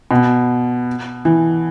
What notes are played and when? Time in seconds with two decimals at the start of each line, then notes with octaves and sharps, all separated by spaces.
0.11 B2
1.25 E3